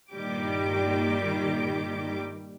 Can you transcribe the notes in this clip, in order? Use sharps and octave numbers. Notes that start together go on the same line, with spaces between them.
G2 A#2 D#3 G3 G4 D6